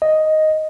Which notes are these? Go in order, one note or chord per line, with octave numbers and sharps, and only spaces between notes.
D#5